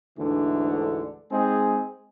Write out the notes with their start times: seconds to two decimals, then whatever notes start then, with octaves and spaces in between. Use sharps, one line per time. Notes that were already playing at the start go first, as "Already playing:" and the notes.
0.18 D2 G#2 D3 E3
1.32 G#3 C4 D#4 G#4